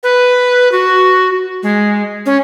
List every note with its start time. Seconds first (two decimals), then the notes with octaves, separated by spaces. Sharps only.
0.03 B4
0.72 F#4
1.63 G#3
2.26 C#4